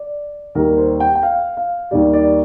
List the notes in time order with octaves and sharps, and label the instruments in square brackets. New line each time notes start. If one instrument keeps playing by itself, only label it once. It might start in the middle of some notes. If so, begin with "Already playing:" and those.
Already playing: [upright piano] D5
D#2 D#3 G3 A#4
C5
G5
G5
F5
F5
D#2 D#3 G3 D5
D5